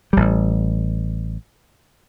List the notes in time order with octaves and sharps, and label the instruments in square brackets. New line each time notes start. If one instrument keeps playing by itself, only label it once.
[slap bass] A1 G3